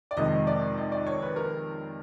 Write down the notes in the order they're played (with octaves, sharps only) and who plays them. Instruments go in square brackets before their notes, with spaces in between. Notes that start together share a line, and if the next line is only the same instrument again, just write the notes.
[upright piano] D5
[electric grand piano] F2 C3 D#3 G#3 [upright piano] D#5
[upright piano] D5
D#5
D5
C#5
B4
A#4